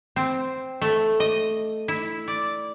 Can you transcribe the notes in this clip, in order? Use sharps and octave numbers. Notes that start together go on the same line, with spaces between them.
C4
A3
D#5
E4
D5